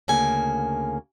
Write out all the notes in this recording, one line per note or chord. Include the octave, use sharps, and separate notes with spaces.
D2 C#3 A#3 G#5